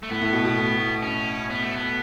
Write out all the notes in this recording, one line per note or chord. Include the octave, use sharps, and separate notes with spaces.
A3
A2 B3
A2
B2
B2
A2
C#4
B3
A3
B3